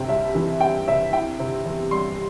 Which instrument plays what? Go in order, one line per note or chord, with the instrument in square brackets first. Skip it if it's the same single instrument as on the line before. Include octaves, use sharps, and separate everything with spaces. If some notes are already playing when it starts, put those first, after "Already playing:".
Already playing: [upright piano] C3 C4 G5
C2 E5
E3
C4 G5
C3 E5
E4 G5
C3
E2
G3 C6